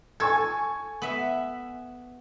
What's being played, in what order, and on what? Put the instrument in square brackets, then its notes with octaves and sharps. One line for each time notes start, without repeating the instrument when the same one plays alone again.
[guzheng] A4 [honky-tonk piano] G#5 C#6 G#6
[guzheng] B3 E5